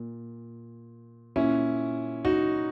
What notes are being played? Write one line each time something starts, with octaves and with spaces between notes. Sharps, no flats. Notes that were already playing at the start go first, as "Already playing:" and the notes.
Already playing: A#2
A#2 C#4 E4
D#4 F#4